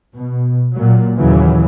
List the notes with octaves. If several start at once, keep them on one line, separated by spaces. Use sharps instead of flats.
B2
A#2 F#3
D#2 C#3 E3 F#3